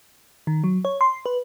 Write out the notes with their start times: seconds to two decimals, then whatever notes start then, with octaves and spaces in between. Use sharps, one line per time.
0.47 D#3
0.64 F#3
0.85 C#5
1.01 C6
1.26 B4